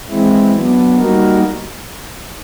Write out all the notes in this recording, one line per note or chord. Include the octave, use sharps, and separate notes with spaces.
E3 G#3 C4 E4
F#3 B3 D4
G3 A#3 D#4 F#4 A#4